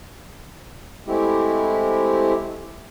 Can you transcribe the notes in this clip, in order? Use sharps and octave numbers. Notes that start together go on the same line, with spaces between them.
G#3 A3 C4 E4 G4